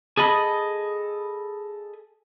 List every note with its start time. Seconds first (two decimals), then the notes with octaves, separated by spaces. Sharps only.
0.17 G#4 A4 D#5 B5